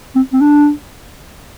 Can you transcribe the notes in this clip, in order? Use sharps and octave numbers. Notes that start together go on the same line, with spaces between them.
C4
C4
D4